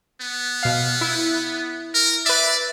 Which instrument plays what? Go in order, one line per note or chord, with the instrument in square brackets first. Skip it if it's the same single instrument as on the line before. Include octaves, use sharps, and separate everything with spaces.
[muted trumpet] B3
[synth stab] B2 F5
E4
[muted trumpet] A#4
[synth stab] B4 E5 [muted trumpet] D5